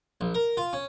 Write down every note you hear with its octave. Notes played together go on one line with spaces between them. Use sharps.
A#1
A#4
F4
C#4